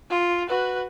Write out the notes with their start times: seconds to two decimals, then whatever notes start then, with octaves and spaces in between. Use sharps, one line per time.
0.10 F4
0.48 F#4 B4